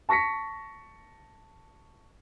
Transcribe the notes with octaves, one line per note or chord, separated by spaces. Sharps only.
A5 C#6 A#6 B6 C#7